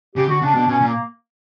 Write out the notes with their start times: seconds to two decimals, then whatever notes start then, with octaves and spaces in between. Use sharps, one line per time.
0.16 C#3 G4
0.29 D3 F#4
0.41 C#3 D4
0.54 B2 D4
0.67 B2 C#4
0.81 A#2
0.86 A#3